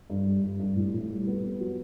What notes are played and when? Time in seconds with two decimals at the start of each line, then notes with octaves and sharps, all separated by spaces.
0.10 G2
0.26 G3
0.43 G2
0.60 G2
0.76 A2
0.94 A2
1.10 G3
1.27 B3
1.44 B3
1.60 F#3